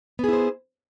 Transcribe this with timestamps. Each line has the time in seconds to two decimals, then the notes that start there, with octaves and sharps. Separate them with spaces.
0.19 B3
0.24 G#4
0.28 E4
0.33 C5